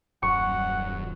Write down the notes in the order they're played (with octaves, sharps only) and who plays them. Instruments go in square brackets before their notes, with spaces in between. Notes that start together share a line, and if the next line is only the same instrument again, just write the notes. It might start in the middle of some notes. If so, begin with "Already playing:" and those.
[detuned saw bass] D#1 [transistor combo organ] F#2 [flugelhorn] F#5 [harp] C#6